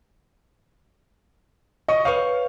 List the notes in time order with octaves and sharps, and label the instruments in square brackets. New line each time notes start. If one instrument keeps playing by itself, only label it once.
[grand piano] D#5 C#6
[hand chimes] B4 C#5 [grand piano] F5 C#6